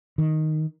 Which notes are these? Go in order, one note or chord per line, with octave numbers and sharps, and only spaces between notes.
D#3